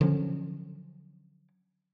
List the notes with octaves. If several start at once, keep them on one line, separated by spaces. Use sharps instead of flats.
D3 F3 F#3 C#4